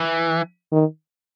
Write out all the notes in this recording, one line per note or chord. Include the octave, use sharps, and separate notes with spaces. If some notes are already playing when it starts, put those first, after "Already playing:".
Already playing: E3
D#3